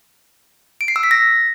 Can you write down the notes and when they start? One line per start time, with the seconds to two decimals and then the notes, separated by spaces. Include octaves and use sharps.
0.81 D7
0.88 C7
0.96 E6
1.03 B6
1.11 A#6